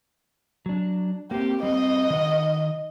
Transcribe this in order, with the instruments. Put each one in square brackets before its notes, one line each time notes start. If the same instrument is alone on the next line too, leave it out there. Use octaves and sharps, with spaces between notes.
[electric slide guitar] F#3 D4
[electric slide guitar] A#3 C4 [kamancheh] G4
[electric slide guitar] G3 C4 [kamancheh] D#5
[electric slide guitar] D#3 F#5